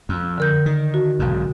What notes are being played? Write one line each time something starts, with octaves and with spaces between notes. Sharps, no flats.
F2
D3 A#4 G6
D#3
F#4
B1 G#2